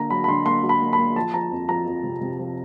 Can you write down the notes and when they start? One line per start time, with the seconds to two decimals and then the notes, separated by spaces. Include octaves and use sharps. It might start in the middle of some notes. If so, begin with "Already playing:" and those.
Already playing: D3 A#3 A#5
0.10 F#3 B5
0.24 B5
0.28 D3 C6
0.46 A#3 C6
0.63 F#3
0.69 B5
0.81 A#3
0.93 B5
0.98 A#3
1.16 F3 A5
1.34 F3 A#5
1.51 F2
1.69 F3 A#5
1.87 F2
2.04 C3
2.21 C3
2.39 F3